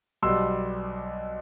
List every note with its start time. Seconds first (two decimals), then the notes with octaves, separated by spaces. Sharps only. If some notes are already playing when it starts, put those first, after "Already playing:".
0.22 B1 B2 G3 C6 E6